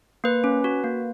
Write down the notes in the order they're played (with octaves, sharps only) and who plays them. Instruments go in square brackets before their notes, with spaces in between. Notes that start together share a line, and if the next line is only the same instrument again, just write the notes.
[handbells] A#3 B4
C#4
F#4
A#3